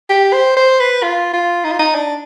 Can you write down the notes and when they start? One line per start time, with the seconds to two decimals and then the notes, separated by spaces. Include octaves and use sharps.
0.10 G4
0.33 C5
0.56 C5
0.80 B4
1.03 F4
1.33 F4
1.64 D#4
1.72 F4
1.79 D#4
1.95 D4